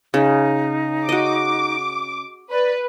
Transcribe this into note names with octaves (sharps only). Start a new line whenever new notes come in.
C#3 D#4
F#4 D#5 D6
B4 D5